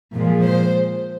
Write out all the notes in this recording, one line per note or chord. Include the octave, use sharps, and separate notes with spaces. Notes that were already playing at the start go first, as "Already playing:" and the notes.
A#2 F3 G#3
C5